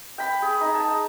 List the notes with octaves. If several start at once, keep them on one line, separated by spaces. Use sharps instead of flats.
G5 B5
G#4
D#4
A5